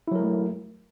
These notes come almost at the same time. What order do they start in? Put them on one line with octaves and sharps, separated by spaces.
E4 F#3 A#4 G#3 A3